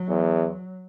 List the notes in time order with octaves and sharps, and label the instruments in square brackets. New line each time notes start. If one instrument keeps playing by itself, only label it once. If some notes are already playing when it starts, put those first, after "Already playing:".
Already playing: [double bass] F#3
[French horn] E2